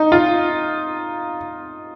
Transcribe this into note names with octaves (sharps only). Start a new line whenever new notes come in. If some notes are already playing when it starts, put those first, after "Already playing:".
Already playing: D#4
F4